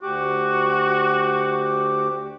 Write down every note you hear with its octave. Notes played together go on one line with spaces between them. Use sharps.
D2 F#4 G4 D6